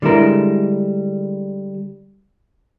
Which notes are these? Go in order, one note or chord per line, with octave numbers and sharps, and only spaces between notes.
D3 G3 G#3 E4 A#4